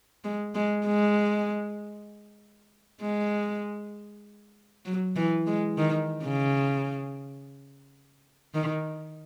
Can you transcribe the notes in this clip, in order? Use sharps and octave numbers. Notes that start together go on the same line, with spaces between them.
G#3
G#3
G#3
G#3
F#3
E3
G#3
D#3
C#3
D#3